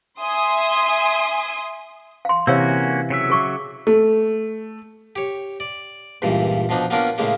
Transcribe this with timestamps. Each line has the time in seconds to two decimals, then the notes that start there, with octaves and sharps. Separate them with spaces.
0.20 E5 G#5 C6 D#6
2.25 F5 C6
2.47 C3 E3 A#3 C#4 F#4 C#5 F5 E6
3.10 C#3 F#3 E5
3.30 G#4 C#6 D6
3.87 A3
5.16 G4 C#5
5.60 D5
6.22 C#2 G2 A#2 E3
6.69 B2 F3 D4 D#4
6.90 A#3 B3 C#4 D4 F4 A#4
7.18 A2 C#3 G#3 A#3